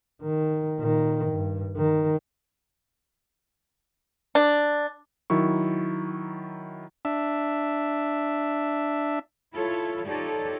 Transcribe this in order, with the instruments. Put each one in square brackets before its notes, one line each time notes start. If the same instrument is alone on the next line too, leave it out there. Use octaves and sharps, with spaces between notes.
[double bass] D#3
A#2 D#3
G2
D#3
[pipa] D4
[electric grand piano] D#3 F#3 E4 C#6
[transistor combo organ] D4 E5
[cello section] E4 F4 A4 C#5
D#4 F4 G4 A4 C#5 D5